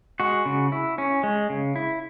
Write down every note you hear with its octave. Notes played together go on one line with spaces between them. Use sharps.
G#3 F#4
C#3
E4
C#4
G#3
C#3
E4